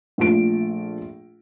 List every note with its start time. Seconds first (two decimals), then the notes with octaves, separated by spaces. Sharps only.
0.18 A#1 A3 F4 D7